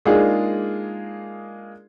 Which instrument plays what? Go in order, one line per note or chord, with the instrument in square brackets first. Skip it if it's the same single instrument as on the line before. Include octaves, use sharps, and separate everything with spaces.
[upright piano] G#3 A#3 D4 D#4 F4 G#4